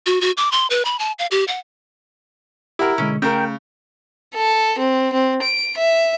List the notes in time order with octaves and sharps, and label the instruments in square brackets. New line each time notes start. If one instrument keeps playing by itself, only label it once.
[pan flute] F#4
F#4
D6
C6
B4
B5
A5
F5
G4
F#5
[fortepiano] E4 A#4 [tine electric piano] G4 F#5
[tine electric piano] B2 D3 G#3 [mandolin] C#4
[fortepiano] C#3 [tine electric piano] A3 [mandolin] A#4 G5
[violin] A4
C4
C4
D7
E5